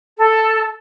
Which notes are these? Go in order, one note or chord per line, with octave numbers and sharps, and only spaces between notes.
A4